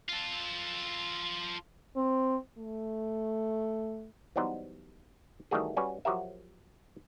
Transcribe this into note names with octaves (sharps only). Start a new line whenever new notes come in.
F4 A4
C4
A3
E3 F#3 G3 B3 D#4 C5
D#3 E3 G3 A3 F#4 G#4
G3 C#4 F#4 B4
F3 F#3 F#4 G4 A#4 E5